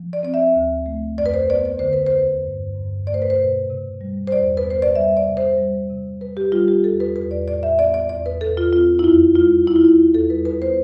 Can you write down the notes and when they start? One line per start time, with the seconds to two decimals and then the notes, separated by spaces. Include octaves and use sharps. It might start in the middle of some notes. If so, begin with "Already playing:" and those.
Already playing: F3
0.13 D5
0.23 C4 D5
0.34 E5
0.55 D2
0.86 A3
1.18 F2 D5
1.26 B4
1.34 C5
1.50 B3 D5
1.65 D5
1.79 D3 C5
1.93 B4
2.07 C5
2.12 E2
2.43 G2
2.75 G2
3.07 A3 D5
3.14 C5
3.22 B4
3.30 C5
3.38 B2
3.70 C3
4.01 G3
4.27 C5
4.32 E2 D5
4.57 B4
4.64 B3
4.70 C5
4.82 D5
4.96 G3 E5
5.17 D5
5.27 C3
5.37 C5
5.58 G3
5.90 C3
6.21 G3 B4
6.37 G4
6.52 G3 F4
6.68 G4
6.84 E2 A4
7.00 B4
7.16 E2 B4
7.31 D5
7.47 A2 D5
7.63 E5
7.79 B3 D5
7.94 D5
8.09 E2 D5
8.26 B4
8.41 E2 A4
8.57 F4
8.73 C4 F4
8.99 E4
9.04 F2 F4
9.35 G3 F4
9.67 B3 E4
9.76 F4
9.85 E4
9.98 E2
10.14 A4
10.30 G3 B4
10.45 B4
10.62 B3 C5